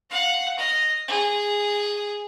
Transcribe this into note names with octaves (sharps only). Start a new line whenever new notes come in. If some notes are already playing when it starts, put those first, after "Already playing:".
F5 F#5
D#5 F6
G#4